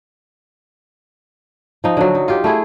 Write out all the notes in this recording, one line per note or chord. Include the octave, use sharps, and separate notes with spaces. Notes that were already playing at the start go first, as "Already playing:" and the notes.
F3 D#4
D3 F#3
D#4
F4 G4
A3 E4 G#4